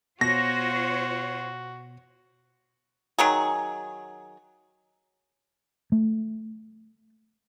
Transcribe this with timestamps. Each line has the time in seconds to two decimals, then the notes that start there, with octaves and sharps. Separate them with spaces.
0.21 B2 F4 F#4 C5 C#5 A#6
3.18 D#3 F#3 G#4
5.92 A3